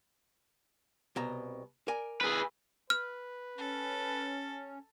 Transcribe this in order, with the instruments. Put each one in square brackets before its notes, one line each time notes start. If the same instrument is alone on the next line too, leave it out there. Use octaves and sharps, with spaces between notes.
[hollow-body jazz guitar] C2 B2 A#5
A#4 D5 G#5
[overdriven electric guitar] G#4 B4
[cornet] B4 [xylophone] F6
[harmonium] C#4 [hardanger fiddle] A4